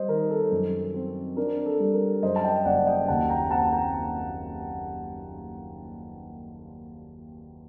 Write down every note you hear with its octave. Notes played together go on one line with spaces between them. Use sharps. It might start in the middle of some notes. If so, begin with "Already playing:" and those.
Already playing: G3 C5 D#5
D#3 A#4
A4
F#2
C4
D4 A#4
A4
G3
A#4
F#2 C5 D#5
A5
D#5 G5
F#1 D5 F#5
D#5 G5
D#2 F#5 A5
G5 A#5
C4 F#5 A5
G5 A#5